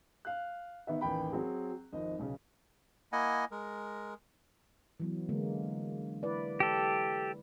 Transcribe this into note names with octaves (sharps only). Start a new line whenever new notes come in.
F5 F#6
D#3 B3 E5
A1 D#2 G5 B5
F#3 C4 G#4
G#1 F2 D#5
B1 C#3
A#3 E4 D#5 F#5 G#5
G#3 A#4
E3 F#3 B3
D3 G#3 A#3
E4 B4 D5
G4 A4